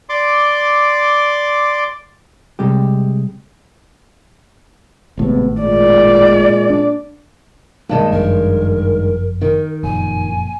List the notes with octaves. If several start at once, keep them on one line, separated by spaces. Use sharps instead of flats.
D5 C6 D6
C3 G3 G#3 G4
G#1 A2 C3 G#3 B3
A#2 G#3 D5
D4
G2 D#3 G#3 A#3 D4 A5
G1 F#2 F3 A#4
D#3 A#4
F#1 F2 A#2 G#5